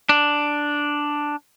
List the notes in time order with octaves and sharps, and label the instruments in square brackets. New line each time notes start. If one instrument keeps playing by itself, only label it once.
[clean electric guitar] D4